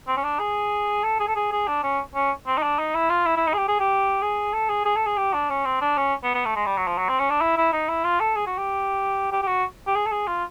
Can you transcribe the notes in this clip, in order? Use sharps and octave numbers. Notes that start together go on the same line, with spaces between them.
C4
C#4
D4
G#4
A4
G#4
A4
G#4
G#4
D4
C#4
C#4
C4
D#4
D4
D#4
E4
F4
E4
E4
D#4
G#4
G4
G#4
G4
G#4
A4
G#4
G#4
A4
G#4
G4
D4
C#4
C4
D4
C#4
B3
B3
A3
G#3
G3
F#3
F3
F#3
C4
C#4
D4
E4
E4
D#4
E4
F4
A4
G#4
F#4
G4
G4
G4
F#4
G4
G#4
A4
G#4
F4